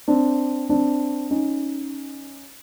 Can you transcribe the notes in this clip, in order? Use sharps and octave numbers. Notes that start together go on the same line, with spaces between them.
C4 D4
C4 D4
C#4 D#4